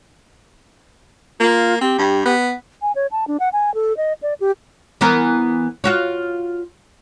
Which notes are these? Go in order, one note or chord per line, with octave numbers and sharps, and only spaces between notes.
A#3 F4
C4 G4
G2
B3
G#5
C#5
A5
D4
F#5
G#5
A4
D#5
D5
G4
E3 B3 A#4
F4 F#4 C#5